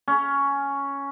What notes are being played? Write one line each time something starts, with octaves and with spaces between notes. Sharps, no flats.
C#4